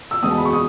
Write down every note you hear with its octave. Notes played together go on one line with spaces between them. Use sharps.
E6
E2 B2 G#3 D#6
A5
B5
C#6
D#6